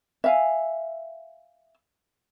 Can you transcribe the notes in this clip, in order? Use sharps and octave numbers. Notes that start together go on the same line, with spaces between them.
E5 F5 G#5